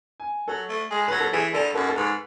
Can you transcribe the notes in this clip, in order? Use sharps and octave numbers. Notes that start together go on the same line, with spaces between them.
G#5
F#3 A4
A3
G#3
F#3 B4
A4
E3 G#4
D3 A4
F#2 A4
A4
G#2 B4